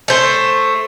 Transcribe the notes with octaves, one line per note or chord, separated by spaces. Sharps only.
A3 C5